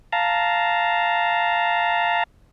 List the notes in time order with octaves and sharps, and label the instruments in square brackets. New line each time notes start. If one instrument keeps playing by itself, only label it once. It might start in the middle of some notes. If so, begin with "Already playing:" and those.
[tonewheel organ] F5 A5 A#5